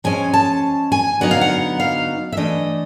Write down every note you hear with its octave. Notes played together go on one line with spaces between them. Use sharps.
F3 G#3 C#4 G#5
A5
G#5
D3 F#3 B3 D#4 F#5
F5
F#5
F5
E5
E3 A3 D4 D#5